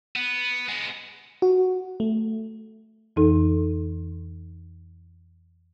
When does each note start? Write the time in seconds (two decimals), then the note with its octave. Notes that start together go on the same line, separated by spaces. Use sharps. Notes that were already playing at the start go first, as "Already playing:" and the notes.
0.16 B3
0.69 G#3 B3
1.42 F#4
2.00 A3
3.16 F2 E3 D#4 A4